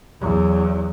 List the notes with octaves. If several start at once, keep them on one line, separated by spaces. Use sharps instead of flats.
E2 F#3